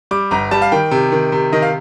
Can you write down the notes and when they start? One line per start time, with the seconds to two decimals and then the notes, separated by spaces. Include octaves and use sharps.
0.11 G3 D6
0.31 G1 A#5
0.51 G3 A5
0.62 F5
0.72 D#3 G5
0.91 C3
1.12 D#3
1.32 C3
1.52 D#3 D#5
1.62 F5